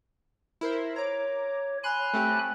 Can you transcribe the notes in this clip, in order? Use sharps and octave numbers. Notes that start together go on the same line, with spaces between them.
E4 A#4 C5
C#5 A#5 D6
G#5 B5 C6 F6 F#6
A3 C4 G4